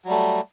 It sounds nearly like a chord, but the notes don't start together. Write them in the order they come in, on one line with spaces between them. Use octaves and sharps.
F#3 G3 A3